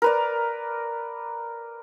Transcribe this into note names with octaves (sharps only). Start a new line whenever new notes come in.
A#4 B4 D5